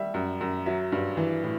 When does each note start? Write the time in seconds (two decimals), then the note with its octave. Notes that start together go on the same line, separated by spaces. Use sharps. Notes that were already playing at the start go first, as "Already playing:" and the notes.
Already playing: G3 E5
0.14 F#2
0.41 F#2
0.66 F#3 E5
0.92 G2
1.17 E3
1.43 A2